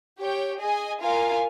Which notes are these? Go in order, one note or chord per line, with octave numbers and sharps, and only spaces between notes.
G4 C#5 G5
G#4 D#5 G#5
F4 A#4 F5 G#5